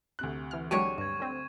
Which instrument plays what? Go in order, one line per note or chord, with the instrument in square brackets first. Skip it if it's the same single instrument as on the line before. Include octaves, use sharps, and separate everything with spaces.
[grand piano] D2 C3 F#6
[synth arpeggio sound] E3 F6
[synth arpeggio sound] F#3 G#3 F#4 [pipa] D4 G4 C#5 [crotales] C#6 D#7
[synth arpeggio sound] G2 [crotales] C#6 G#6
[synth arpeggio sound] D3 C4